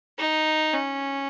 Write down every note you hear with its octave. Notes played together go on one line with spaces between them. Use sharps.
D#4
C#4